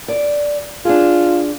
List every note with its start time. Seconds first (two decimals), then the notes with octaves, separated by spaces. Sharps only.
0.08 D5
0.85 D4 F4 G#4